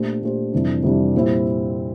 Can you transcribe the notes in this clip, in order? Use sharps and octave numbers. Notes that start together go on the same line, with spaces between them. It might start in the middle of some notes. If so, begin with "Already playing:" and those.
Already playing: A#2 A3 D4 G4 C5
A#2 A3 D4 G4 C5
F2 C3 E3 G3 D4
F2 C3 E3 G3 D4
A#2 G3 C4 E4